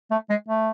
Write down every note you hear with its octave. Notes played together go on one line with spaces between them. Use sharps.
A3
G#3
A3